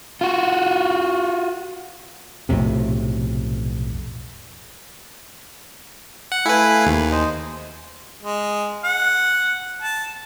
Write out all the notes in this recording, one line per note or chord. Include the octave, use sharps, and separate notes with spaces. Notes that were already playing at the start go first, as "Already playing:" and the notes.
F4 F#4
B1 F2 A2 C3
F#5
A3 E4 B4 F5 G#5
D#2
C5 D#5
G#3
F#5
A5